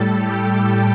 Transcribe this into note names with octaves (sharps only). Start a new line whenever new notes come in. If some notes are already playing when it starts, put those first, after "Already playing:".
Already playing: A2 G3 A4
G4